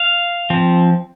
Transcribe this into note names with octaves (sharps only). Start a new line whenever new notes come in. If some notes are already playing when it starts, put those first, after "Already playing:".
Already playing: F5
F3 C4